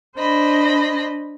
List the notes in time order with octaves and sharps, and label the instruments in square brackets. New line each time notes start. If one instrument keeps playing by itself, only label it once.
[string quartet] D4 C5 D#5 B5